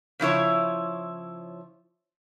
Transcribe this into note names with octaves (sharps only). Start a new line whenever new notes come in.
C#3 F3 E4 C#5